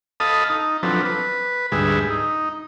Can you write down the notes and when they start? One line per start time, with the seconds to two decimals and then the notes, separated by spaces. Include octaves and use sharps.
0.20 A4 D#5 F5 A5 B5 D#6
0.49 D#4
0.83 F3 F#3 C4 D4 A4 B4
1.05 B4
1.72 D2 G#2 G3 G#4 B4 E5
2.10 D#4